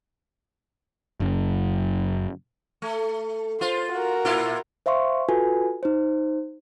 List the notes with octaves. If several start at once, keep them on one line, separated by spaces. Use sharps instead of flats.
F#1 F#2
A3
F4 C5
F#4 A#4
A#2 E4 F4
C5 E5 F5 C6 C#6
F4 F#4 A4 B4 G#5
D#4 C5